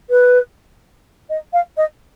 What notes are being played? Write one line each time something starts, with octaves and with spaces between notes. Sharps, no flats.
B4
D#5
F5
D#5